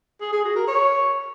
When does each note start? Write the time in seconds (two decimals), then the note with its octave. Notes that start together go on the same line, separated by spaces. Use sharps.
0.21 G#4
0.33 G#4
0.44 F#4
0.56 A#4
0.68 C#5